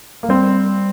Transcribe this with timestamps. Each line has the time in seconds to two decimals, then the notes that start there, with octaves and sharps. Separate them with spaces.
0.23 A#3
0.29 G3 C4